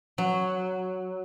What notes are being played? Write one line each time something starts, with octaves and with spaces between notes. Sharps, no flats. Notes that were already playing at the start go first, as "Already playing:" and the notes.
F#3